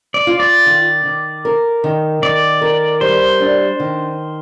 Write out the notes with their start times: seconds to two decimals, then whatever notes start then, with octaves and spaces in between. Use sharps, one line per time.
0.14 D5
0.27 F4
0.40 D5
0.66 D#3
1.05 D#3
1.45 A#4
1.84 D#3
2.23 D#3 D5
2.62 A#4
3.01 G3 C5
3.40 D4
3.80 D#3